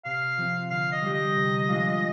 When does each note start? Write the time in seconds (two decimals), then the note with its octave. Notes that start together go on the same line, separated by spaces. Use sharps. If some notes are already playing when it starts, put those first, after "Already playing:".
0.05 C3 F5
0.38 F3 C4
0.70 D3 F5
0.92 D#5
1.02 G3 D4 G4
1.14 D#5
1.36 C3
1.68 F3 G#3 D4 F4